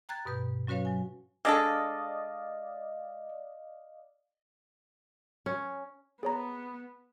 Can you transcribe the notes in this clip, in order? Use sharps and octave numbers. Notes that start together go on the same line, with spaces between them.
G5 A#5 F#6 G#6 A6
G2 B2 B4 G6
F#3 C#4 F#4 B4 C#5 F5
F#3 G#5
G#3 D4 A4 D5 D#5 F5
C#4
B3 G#4 C#5 A#5